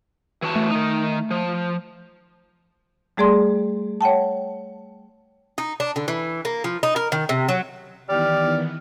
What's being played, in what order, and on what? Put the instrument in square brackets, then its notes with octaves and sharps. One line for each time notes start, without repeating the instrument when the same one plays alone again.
[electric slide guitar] E3 F#4 A5
[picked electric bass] A3
[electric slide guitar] D#3 D#4
F3
[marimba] G3 A3 G#4 D5 C6
C#5 F#5 G5 A5
[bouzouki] D#4
D4
D3
E3
A#3
F3
D#4
A#4
D#3
C3
F#3
[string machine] D#3 E3 B3 [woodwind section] G3 F6 [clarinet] D5